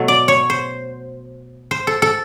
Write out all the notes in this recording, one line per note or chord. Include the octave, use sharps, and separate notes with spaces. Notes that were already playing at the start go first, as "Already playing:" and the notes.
Already playing: B2 F#3 A3
D5
C#5
C5
C5
A4
A4